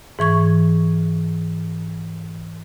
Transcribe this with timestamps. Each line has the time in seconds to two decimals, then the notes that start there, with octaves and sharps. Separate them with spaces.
0.19 G#2 E3 C#6 G#6